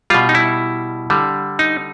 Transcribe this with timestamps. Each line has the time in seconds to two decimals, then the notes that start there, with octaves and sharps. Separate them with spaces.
0.10 B2 G3 F4
0.29 D#4
0.35 E4
1.10 D3 G3
1.59 D#4